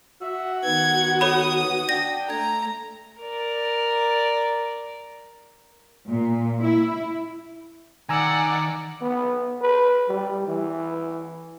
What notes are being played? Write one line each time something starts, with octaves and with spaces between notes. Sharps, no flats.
F#4 E5
D#3 B3 G#6
A4 C#5 B5 D#6
D4 G5 A#6
A3 A#5 G#6
A#4 D5
A#2
E4
D#3 D5 F#5 G#5 A#5 E6
B3
B4
G3
E3